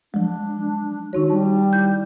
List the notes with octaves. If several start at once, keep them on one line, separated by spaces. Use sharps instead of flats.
F3 F#3 G#3 D4
D#3 D#4 F#4 C#5
G3 A5
E4 G6